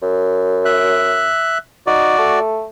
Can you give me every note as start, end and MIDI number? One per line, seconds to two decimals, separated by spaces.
0.02 1.33 42
0.65 1.58 76
0.65 1.58 90
1.87 2.16 63
1.87 2.39 66
1.87 2.39 74
2.19 2.68 57